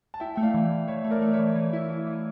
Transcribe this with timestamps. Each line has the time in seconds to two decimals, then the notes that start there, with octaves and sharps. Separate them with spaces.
0.14 A5
0.20 E4 E5 G5
0.36 A3 G5
0.43 D5 F5
0.54 E3
0.71 E3
0.88 E3 C#5 E5
1.04 A3
1.11 A#4 D5
1.22 A3
1.34 C#5 E5
1.39 E3
1.56 E3
1.73 E4
1.90 E3
2.07 E3